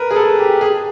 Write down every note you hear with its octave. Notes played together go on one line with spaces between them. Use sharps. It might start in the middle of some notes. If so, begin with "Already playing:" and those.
Already playing: A#4 B4
G#4
A4
G4
G#4